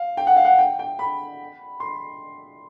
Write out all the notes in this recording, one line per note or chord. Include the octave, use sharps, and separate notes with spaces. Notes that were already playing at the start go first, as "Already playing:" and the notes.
Already playing: F5
G5
F#5
F5
F#5
G5
G5
B5
C6